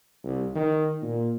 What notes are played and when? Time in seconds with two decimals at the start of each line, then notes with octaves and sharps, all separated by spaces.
0.24 C2
0.55 D#3
1.02 A#2